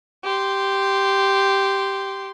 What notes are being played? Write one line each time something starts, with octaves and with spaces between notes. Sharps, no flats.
G4 C6